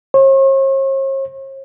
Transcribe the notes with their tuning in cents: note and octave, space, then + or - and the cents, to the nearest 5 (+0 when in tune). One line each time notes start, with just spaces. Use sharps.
C#5 -45